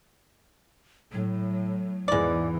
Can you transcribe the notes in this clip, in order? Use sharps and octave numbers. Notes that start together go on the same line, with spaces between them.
A2 F#3
E2 G#2 E3 G#3 D5